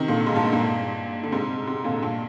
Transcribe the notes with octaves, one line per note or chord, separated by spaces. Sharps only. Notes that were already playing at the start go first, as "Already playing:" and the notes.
Already playing: C3 D#3
A#2 D3
G#2
G2 A#2
G#2
G2 A#2
D3
G#2 C3
G#2 C3
A#2 D3
G2 A#2